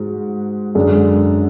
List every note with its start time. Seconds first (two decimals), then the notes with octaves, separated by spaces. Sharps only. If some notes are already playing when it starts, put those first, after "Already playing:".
Already playing: G#2 G#3 F#4
0.75 F#2 D3 G#3 D4